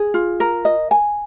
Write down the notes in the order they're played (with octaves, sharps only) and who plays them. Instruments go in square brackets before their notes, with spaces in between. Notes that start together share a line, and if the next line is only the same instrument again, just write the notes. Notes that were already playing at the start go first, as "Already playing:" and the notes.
Already playing: [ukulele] G#4
F4
A#4
D#5
G#5